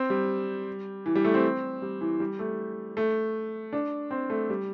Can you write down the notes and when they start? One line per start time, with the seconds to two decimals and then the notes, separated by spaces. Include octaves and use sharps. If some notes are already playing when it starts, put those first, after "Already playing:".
Already playing: C4
0.10 G3
1.06 E3
1.15 G3
1.25 A3
1.34 C4
1.82 G3
2.01 E3
2.20 G3
2.39 A3
2.97 A3
3.73 D4
4.11 C4
4.30 A3
4.50 G3